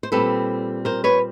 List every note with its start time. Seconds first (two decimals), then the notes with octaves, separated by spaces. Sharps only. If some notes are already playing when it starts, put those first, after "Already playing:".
0.03 C5
0.12 A#2 G3 C4 A4 B4
0.85 A#4 C5
1.04 B4 C#5